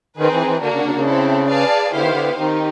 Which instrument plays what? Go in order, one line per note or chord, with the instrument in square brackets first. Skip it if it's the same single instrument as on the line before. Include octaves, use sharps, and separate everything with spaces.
[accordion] D#3 [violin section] C4 D#4 G#4 B4
[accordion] E3
E3
[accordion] D3 [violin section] A#3 D4 F#4 A#4
[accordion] C#3
C#3
C#3
[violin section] C4 E4 A4
G#4 B4 D5 F5 A5
[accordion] D3 [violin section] B3 E4 G4 C5 F5
[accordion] D#3
D3
[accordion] D#3 [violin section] C4 D#4 G4